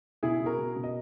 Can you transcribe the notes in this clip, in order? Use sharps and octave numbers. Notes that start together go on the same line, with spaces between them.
B2 E4 G#4
B2
F#4 A#4
B2
B2
D#5